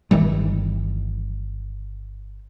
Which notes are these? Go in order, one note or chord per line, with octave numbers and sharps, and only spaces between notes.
G1 D#3 E3 G3